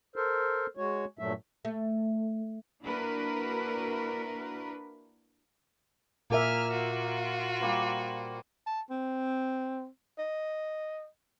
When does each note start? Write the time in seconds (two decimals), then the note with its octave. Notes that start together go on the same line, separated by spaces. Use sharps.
0.16 A4 A#4 C5
0.77 G#3 F#4 C#5
1.19 G2 A#2 F#3 A3 E5
1.65 A3
2.83 A#3 D4 E4 F#4 A#4 B4
6.30 A#2 A#3 A#4 E5 G#5 A#5 F6
6.71 F4 F#4
7.61 G3 A#3 C5
8.66 A5
8.90 C4
10.19 D#5